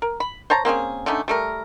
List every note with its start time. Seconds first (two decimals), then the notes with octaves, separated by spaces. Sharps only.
0.02 A#4
0.20 B5
0.50 C5 C#5 A5 A#5
0.65 A#3 C4 C#4 G#4
1.06 D3 A3 C#4 D#4
1.28 G3 A3 A#4